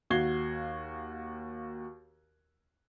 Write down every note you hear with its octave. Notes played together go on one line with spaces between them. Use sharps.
D#2 F#4 F5 G#6 C7 G7